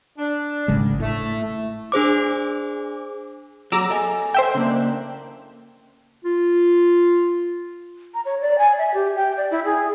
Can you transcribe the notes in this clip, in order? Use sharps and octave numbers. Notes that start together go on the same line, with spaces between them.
D4
G#1 C#3 G#3
A2 A3
D4 G#4 C5 D6
F#3 G#4 A#5 D6 E6
A4 D#5 G#5
C5 E5 G5
C#3 A#3 D4
F4
A#5
C#5
D5
G#5
E5
G4
G5
D5
E4
G#4